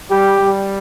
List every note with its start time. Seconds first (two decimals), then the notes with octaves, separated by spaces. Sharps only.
0.10 G3 G4
0.39 G3